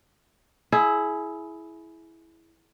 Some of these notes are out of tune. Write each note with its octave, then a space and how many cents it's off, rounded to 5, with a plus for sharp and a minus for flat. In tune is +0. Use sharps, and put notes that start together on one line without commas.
E4 +0 G#4 +25